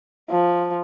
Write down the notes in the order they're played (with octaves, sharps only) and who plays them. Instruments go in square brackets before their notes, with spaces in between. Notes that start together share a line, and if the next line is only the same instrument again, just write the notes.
[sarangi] F3